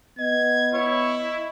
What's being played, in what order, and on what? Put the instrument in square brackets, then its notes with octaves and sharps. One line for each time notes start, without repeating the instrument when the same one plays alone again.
[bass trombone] B3 [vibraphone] D#5 [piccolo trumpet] G#6
[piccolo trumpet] E4 [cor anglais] C#5